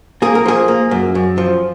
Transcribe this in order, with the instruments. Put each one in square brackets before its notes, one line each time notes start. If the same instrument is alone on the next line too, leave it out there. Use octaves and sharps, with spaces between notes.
[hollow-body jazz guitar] A#3 G#4
A#4
F3 G#4
A#3
F#2
F#2
F3